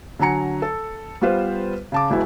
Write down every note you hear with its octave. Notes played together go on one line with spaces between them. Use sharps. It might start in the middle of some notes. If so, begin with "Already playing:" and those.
D3 F#3 G#5 A#5 C#7
A4
G3 B3 F4 B4 C5
C#3 A5 D6
E1 B2 E4